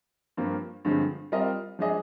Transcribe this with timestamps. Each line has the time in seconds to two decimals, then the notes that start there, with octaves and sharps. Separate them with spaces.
0.37 G2 F3 A#3
0.85 G2 D3 F3 G#3 C4
1.32 G3 C4 F4 A#4 D#5
1.79 F3 G#3 D4 G#4 D#5